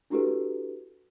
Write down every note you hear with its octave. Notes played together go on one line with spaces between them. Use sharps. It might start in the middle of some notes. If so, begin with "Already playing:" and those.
D4 E4 F#4 G4 A4 B4